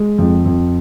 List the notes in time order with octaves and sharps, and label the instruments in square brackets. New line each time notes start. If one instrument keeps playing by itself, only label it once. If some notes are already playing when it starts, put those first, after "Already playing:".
Already playing: [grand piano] G#3
F2
F2